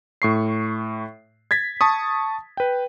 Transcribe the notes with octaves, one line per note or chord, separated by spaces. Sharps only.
A2 C#6 C7
G#6 A6 B6
A5 C#6 D#6
B4 G5